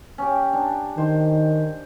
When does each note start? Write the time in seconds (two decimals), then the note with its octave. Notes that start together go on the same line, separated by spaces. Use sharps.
0.18 C#4 G4
0.53 D4
0.98 D#3 C5